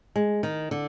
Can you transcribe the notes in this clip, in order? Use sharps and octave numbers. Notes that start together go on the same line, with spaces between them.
G#3
D#3
D3